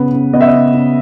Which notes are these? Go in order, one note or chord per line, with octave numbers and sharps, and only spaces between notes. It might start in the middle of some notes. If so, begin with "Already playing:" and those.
Already playing: C#3 B3 B4
C#3
B3 D#5
E5
D#5
C#3
C#3